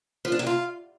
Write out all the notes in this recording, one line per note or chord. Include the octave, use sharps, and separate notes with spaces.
F3
D4
C3
F4